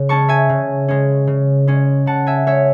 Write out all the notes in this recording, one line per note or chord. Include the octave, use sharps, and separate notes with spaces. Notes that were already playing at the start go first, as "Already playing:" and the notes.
Already playing: C#3
G#3 C#4 A5 C#6
E5 G#5
C#3
G#3 C#4
C#3
G#3 C#4
C#3 F#5 A5
E5 G#5
G#3 C#4 C#5 E5